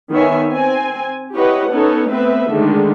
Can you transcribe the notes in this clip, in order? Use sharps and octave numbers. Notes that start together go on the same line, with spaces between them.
D#3 B3 C#5 E5 G#5
C4 G#5
E4 G4 B4 C#5 D#5 F#5
B3 C#4 D#4 A4 C#5
A3 B3 C4 B4 E5
D3 D#3 G#3 A3